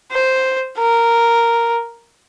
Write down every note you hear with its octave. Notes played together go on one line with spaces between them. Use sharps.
C5
A#4